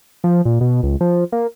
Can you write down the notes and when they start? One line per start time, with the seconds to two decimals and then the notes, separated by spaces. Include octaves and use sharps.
0.24 F3
0.45 A#2
0.61 B2
0.83 C#2
1.01 F3
1.32 A#3